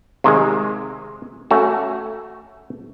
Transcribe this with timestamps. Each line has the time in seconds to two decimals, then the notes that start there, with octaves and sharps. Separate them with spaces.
0.24 C3 D#3 G#3
1.51 A3 C#4 F#4